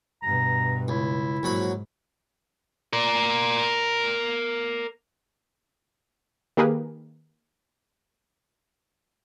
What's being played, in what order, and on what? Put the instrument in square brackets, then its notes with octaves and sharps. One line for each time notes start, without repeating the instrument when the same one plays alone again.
[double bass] G2 B2 [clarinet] A#5
[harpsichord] C#2 [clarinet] E4
[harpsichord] A#1 F#3 B5 [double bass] G#2
[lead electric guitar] A#4 D5
[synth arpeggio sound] D#3 A#3 G4 G#4 A#4 B4